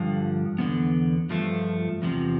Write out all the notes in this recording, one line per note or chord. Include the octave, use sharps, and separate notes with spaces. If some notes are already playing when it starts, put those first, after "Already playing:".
Already playing: G2 D3 F3
E2 D3 F3 B3
G2 F3 A3
E2 C3 F3